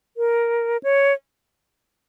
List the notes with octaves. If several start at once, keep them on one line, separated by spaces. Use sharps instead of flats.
A#4
C#5